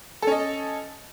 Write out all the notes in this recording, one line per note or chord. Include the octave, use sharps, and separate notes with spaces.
C#4 A4 D#5